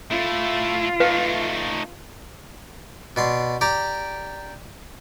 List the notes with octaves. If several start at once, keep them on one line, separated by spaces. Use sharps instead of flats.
A3 E4 F4
A3 D#4 B4 F5
B2 D5 C6
G4 D5 A#5 D6